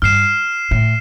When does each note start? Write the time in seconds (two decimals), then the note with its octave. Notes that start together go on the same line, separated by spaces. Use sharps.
0.02 G2 F6 C7 E7
0.71 A2